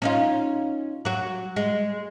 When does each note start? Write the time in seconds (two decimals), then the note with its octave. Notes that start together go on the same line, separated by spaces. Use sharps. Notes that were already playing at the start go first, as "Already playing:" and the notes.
0.02 C#4 D#4 F4
1.05 F#3 F#4
1.56 G#3